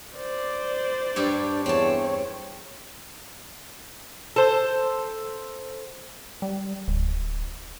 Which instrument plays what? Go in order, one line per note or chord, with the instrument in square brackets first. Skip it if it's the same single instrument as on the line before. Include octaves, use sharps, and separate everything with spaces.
[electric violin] C5 D5
[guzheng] G2 G4 C#5 [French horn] D4
[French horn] E2 [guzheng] C4 A5 [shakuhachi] C#5
[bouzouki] A4 C5
[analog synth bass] G3
D1